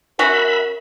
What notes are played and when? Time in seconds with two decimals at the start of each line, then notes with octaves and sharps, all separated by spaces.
0.19 C#4 F#4 A#4 E5 B5